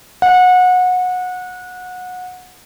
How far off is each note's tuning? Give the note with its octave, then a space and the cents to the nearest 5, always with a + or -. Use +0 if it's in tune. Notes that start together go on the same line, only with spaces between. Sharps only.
F#5 -25